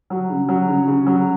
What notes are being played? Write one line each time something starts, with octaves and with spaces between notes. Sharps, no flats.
F#3
C#3
F#3
C#3
C#3
F#3